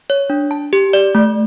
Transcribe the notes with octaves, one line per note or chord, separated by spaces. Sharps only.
C#5
D4
A5
G4
D5
A3